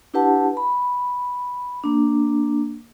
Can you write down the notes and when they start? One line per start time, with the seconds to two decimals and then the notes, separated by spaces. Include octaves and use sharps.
0.14 D4 E4 G4 B4 F#5 A5
0.57 B5
1.84 A#3 D4